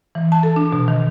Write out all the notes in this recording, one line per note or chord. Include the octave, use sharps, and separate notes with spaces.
E3
A5
A4
D4
B2
D#3